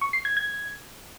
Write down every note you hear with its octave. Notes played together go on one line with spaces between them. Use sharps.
C#6
C7
G#6
G#6